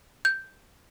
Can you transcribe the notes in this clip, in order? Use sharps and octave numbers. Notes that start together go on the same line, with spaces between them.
G6